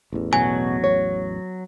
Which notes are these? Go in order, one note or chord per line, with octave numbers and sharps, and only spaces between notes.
A1 E2
B2 F#3 G#5
C#5